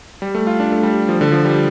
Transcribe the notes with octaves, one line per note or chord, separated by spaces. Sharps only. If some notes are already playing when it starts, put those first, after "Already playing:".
G3
A3
F4
D4
A3
G3
F3
D3
F3
G3